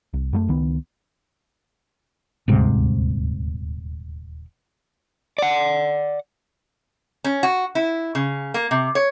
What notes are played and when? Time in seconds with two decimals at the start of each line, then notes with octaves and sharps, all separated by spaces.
0.14 C2
0.33 F#2 F#3 A3
0.48 C#2 D#3 B3
2.48 D#1 D2 G#2 C3
5.38 D5 F#5
7.24 C#4
7.43 F#4
7.75 E4
8.15 C#3
8.54 A#3
8.71 C3
8.95 C#5